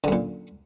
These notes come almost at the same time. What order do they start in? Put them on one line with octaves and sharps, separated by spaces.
D3 F#2 A#2